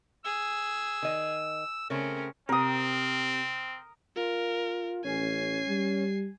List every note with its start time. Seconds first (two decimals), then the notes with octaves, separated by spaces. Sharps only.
0.25 G#4 E6
1.03 D#3 D#5
1.90 C#3 A3 C4 C#4 A#4
2.49 C3 C4 A#4 D#6
4.16 F4 A#4
5.04 A1 C#4 G#5 C7
5.68 G3